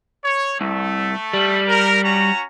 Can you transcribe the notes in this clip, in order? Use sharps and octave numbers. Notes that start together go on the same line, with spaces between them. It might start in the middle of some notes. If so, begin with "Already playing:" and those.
C#5
C2 A3
G3
A#4
C#4 F#4 A#5